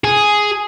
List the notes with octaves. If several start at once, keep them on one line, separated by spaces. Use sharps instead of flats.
G#4